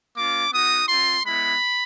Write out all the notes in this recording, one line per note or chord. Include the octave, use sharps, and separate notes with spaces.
A#3 C#4 F4 D6
B3 D#4 F#4 D#6
C4 F4 C6
G#3 B3 E4 B5